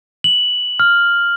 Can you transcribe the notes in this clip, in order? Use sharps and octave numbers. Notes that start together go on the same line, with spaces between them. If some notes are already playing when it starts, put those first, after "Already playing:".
F#7
F6